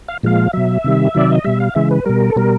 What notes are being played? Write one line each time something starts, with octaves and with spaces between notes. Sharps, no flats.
F5
A#2 F3 G#3 F5
B2 F#3 E5
C3 D#3 G3
C3 D#3 F#3 D5
D#5
B2 G3 E5
F5
C#3 E3 G#3 E5
B4
B2 G3 A#4
A4
B2 G3 A#4